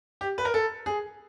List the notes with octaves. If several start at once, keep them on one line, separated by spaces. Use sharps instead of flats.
G4
B4
A#4
A4
G#4